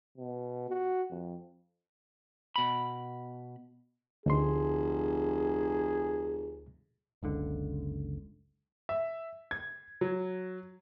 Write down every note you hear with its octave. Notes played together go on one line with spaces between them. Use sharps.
B2
F#4
F2
B2 B5
F1 D2 G#4 C6
F#1 C#2 D3
E5
G#6
F#3